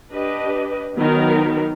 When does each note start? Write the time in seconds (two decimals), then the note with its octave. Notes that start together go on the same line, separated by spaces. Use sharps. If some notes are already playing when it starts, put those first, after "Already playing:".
0.11 D4 G4 B4 D#5
0.96 D#3 F#3 B3 D#4 A#4